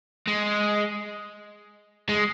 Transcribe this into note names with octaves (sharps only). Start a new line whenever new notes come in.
G#3
G#3